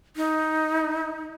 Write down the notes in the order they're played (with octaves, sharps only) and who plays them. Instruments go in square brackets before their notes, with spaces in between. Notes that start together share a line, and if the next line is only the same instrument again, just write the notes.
[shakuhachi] D#4